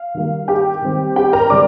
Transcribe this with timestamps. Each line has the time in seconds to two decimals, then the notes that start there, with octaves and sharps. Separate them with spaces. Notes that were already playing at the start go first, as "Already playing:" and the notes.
Already playing: F5
0.15 D#3 G3 A#3
0.48 G4 G5
0.82 D#3 G3 C4
1.16 G4 G5
1.33 A#4 A#5
1.50 D3 G3 C4 D5 D6